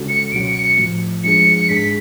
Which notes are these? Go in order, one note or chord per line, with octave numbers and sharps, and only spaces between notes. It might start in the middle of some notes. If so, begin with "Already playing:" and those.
Already playing: C#3 G#3 C#4 F#4 A4
C#7
C#2 B2 F#3 C#4 F#4 D7
C#7
C#7
A2 F3 A3
F3 G#3 D4 G#4 C#7
G#2 G#3 D4 G#4 B6